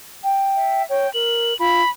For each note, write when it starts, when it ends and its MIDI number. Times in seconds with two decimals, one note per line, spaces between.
0.24 0.82 79
0.56 0.87 76
0.89 1.07 73
0.89 1.13 79
1.14 1.54 70
1.14 1.59 102
1.59 1.81 65
1.59 1.89 83